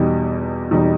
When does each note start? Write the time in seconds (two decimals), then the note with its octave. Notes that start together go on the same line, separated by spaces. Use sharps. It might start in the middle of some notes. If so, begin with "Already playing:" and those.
Already playing: E2 B2 G3 D#4
0.71 E2 B2 G3 D#4